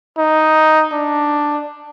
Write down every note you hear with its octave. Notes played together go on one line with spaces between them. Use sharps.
D#4
D4